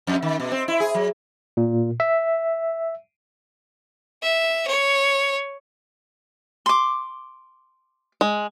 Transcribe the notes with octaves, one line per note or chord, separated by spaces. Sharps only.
F2
D#3
B2
C4
E4
G#4
F#3
A#2
E5
E5
C#5
C6 D6
G#3